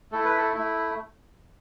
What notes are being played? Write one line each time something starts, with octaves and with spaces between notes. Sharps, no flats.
A3 E4 A4
B4
A4
A3 E4